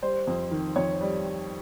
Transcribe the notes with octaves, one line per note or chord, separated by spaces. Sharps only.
G3 C5
F2
D#3
F2 C#5
G3